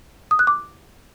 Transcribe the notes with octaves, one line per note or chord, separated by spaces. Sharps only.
D#6
F#6
D6